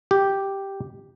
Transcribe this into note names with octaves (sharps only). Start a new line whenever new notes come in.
G4